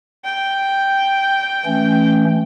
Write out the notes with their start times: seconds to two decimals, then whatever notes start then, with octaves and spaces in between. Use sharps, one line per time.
0.25 G5
1.66 E3 A3 C#4